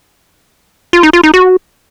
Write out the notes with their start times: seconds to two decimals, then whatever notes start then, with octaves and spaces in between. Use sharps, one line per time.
0.93 F4
1.03 D#4
1.13 F4
1.23 D#4
1.34 F#4